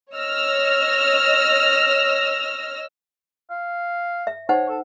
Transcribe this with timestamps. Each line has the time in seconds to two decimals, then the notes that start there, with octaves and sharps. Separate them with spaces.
0.13 C#5 D#5 E6 F6 A#6
3.50 F5
4.27 E5
4.49 D#4 C5 C#5 F#5
4.69 A4